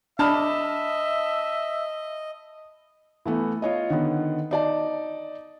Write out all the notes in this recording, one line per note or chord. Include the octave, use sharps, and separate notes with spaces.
D4 D#5 E5 A5 B5 F6
E3 A3 B3
F4 C#5 D#5
D3 D#3 B3
D#4 D5 A5